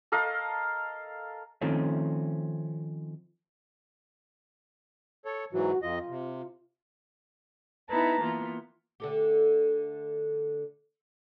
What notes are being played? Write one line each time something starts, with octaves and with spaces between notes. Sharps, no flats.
A4 A#4 D#5 F5
D#3 F3 A3 C4 C#4
A4 C#5
G#2 E3 F#3 F#4
F2 F4 D#5
C3
B3 D#4 E4 B4 A5 A#5
E3 A#3 B3 F4
D3 A3 G4